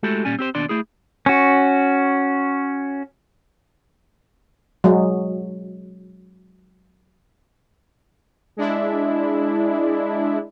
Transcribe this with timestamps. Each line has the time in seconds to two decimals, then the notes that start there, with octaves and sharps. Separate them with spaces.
0.03 G#3 A3 E4 F#4 G4 A4
0.25 A#2 G3 C#4 G#5
0.39 C4 G4 C5
0.55 D#2 B2 D4 D5 C6
0.69 A3 E4 G#4
1.26 C#4 F#4
4.84 F#3 G#3
8.57 G#3 D4 E4